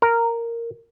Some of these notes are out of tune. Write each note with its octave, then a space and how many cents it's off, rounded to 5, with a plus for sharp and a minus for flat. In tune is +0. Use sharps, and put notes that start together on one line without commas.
A#4 -5